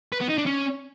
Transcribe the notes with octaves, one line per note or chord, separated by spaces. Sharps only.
B4
B3
D#4
D4
C#4